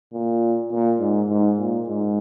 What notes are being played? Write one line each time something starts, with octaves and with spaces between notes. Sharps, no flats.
A#2
A#2
G#2
G#2
A#2
G#2